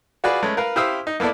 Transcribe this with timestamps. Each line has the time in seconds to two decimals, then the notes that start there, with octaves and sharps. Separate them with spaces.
0.24 F4 F#4 G#4 B4 D5
0.43 G#3 A3 C#4 B4
0.57 A#4 B4 F5
0.76 E4 G4 C5 F5 D#6 E6
1.07 D#4
1.20 A#3 B3 E4 A4 D5